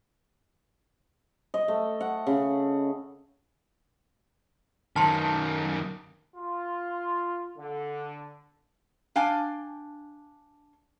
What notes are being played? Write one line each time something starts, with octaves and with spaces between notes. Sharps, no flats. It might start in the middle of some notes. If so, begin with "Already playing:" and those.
D#5
A3
F#5
C#3
F#2 D#3 A5 C6
F4
D3
D4 F5 G5 G#5